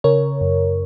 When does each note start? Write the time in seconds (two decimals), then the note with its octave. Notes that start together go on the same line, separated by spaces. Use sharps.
0.04 C#3 A#4 C#5
0.41 F#2